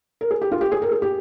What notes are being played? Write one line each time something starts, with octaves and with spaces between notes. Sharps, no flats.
A#4
G#4
G4
F4
G4
G#4
A#4
G#4
G4